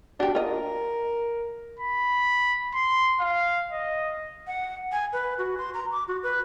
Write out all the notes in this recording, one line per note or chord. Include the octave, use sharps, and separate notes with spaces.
D4 F#4 G4
F4 A#4 D#5
B5
C6
F5
D#5
F#5
G#5
B4
F#4
C6
A#5
D6
F#4
B4